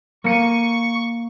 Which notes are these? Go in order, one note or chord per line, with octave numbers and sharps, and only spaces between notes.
A#3 C#6 C#7 D#7